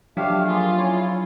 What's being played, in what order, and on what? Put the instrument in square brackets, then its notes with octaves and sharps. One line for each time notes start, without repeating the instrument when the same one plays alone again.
[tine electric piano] F3 F#3 D4 [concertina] A3 G4 F5
[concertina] A#3 G#4 [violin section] F4
[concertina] C#4 E4 C#5